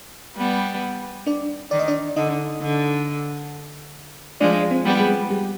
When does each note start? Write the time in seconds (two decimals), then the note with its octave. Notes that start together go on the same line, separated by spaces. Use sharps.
0.37 G3 B3
1.26 D4 D5
1.71 D#3 D5
1.79 D#5
1.88 D4 D5
2.16 D3 D#4 D#5
2.61 D3
4.40 F3 G#3 D4 D5
4.71 C4 C5
4.85 G3 B3
5.00 G#3 G#4
5.30 G3 G4